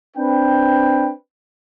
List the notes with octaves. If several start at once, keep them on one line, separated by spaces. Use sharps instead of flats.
C4 D4 B4 G5